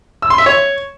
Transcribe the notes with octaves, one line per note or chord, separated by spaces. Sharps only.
E6
C6
E5
C#5